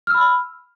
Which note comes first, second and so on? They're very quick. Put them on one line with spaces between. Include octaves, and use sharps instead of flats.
F6 E6 B5